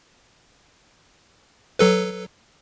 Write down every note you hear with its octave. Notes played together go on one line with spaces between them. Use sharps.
F#3 A4 B4